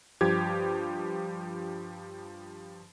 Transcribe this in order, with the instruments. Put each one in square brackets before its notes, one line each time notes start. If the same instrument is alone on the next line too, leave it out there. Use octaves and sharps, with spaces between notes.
[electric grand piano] G2 F3 G4 G#6